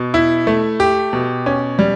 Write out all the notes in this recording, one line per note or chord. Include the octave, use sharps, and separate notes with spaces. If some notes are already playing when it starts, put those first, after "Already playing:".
Already playing: B2
E4
A3
G4
B2
C#4
G3